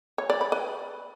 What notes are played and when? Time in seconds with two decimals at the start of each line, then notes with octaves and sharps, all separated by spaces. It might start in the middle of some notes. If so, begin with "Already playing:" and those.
0.18 C#5
0.30 D5
0.41 B5
0.52 B4